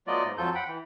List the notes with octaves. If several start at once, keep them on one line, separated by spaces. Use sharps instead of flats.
F#3 A3 B3 F4 D5 D#5
G#2
F2 F3 F#3 F4 A4 G6
F#5 G5 B5
E3